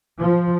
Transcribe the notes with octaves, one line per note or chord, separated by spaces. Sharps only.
F3